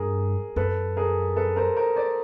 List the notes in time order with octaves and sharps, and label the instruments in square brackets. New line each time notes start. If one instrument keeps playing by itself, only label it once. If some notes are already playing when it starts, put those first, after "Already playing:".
Already playing: [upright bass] G2 [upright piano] G#4 A#4
[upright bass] F#2 [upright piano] A4 B4
[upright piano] G#4 A#4
A4 B4
A#4 C5
A#4 C5
C5 D5